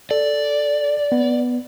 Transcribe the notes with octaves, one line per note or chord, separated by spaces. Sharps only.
A4 D5
B3